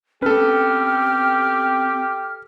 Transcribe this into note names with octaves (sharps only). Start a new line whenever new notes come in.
C4 C#4 G4 A4 B4 F6